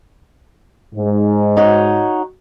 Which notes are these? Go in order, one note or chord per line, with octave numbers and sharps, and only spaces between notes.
G#2
D#4 F#4 C#5